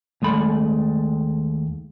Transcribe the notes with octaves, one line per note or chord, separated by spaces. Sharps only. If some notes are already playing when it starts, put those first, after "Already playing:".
D#2 G#3 A3 B5